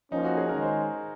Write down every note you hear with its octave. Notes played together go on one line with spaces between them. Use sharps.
F3 A#3 C#4 D#4
F#4
G#4
D#3 G#3 C#4 A#4
C5